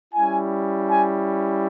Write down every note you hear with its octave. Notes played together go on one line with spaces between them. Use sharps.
G3 C#4 E4 G#5
G#5